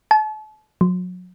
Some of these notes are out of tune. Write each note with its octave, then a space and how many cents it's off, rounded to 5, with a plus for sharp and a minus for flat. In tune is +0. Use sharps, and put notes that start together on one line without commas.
A5 -40
F#3 -35